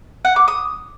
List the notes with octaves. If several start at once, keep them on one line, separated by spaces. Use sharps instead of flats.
F#5
D6
D#6